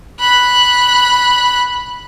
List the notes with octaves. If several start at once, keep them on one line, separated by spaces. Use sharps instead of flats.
B5 F#6